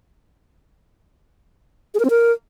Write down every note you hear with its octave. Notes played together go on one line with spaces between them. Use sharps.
G#4
A#4
C4
A#4